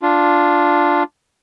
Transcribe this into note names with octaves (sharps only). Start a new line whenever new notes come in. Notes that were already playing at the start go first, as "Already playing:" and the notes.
D4 F4